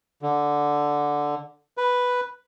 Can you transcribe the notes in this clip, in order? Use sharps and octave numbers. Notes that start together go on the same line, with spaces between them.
D3
B4